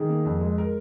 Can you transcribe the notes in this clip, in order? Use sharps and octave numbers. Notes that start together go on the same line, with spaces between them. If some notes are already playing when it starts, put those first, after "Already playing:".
Already playing: D#3 G#4
A#3
F2
G#3
A#4